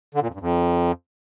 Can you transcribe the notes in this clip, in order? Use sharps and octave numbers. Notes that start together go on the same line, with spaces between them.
D3
A#2
F2
G2
F2